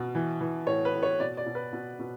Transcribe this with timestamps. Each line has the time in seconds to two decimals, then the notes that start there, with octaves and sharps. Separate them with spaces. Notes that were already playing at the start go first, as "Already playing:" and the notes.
Already playing: B2
0.15 E3
0.41 E3
0.67 A2 C#5
0.85 B4
0.94 A2
1.03 C#5
1.20 B2 D5
1.37 D5
1.46 B2
1.55 B4
1.73 B2
1.99 B2